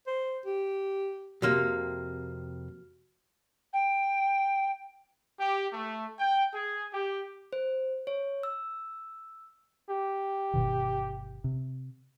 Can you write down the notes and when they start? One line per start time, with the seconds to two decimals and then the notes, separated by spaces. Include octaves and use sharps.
0.07 C5
0.45 G4
1.42 F2 C3 A#3 F#4 F6
3.73 G5
5.39 G4
5.73 A3
6.19 G5
6.54 G#4
6.93 G4
7.53 C5
8.07 C#5
8.43 E6
9.89 G4
10.54 G1 B2 D#3
11.44 C3